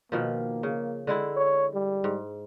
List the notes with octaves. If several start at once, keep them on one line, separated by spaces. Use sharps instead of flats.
B2 D#3 F3 A#3
C#3
D3 G#3 E4
C#5
G3
G#2